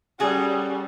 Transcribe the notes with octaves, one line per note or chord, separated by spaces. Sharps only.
G3 C#4 F#4 G#4 A4